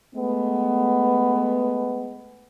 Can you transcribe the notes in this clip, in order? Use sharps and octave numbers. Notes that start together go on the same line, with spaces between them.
G#3 A3 B3